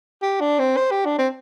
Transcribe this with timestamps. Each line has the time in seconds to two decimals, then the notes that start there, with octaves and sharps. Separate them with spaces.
0.22 G4
0.41 D4
0.59 C4
0.77 C5
0.91 G4
1.05 D4
1.18 C4